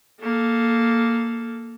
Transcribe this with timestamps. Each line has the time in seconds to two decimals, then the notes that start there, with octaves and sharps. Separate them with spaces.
0.21 A#3 A4